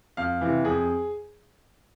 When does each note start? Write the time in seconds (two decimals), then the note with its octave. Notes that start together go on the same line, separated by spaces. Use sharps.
0.17 F2 F5
0.41 C3 E3
0.64 F2 G#4